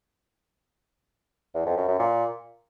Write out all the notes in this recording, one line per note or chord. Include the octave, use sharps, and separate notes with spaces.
E2
F2
F#2
F#2
A#2